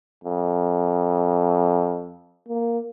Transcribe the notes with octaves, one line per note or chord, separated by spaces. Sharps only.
F2
A#3